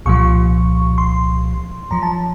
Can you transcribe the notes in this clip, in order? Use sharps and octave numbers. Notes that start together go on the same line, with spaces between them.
C2 A#2 F3 C#6
C6
F#2 F3 A#5
A5